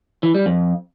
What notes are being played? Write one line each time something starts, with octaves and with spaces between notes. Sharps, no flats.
E3
G3
F2